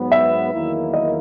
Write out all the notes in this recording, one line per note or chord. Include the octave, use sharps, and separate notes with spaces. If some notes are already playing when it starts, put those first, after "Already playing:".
Already playing: G#2 F#3 B3
E5
E2 D#3 F#3 A#3 E4
D#5